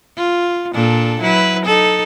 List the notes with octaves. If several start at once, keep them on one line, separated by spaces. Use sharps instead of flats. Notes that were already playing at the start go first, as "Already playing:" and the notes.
F4
A#2 D4 A4
F#3 E4 B4
D#4 A4